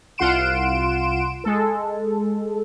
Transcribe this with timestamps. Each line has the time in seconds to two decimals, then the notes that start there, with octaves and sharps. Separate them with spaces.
0.18 C2 F4 F#5 C6 D7 E7
1.44 G#3 A4